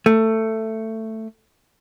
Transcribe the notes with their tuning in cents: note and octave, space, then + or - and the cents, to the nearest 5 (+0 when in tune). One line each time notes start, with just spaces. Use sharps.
A3 +15